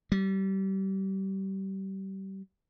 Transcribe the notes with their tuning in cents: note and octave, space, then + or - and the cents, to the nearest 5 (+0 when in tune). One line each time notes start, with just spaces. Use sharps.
G3 -25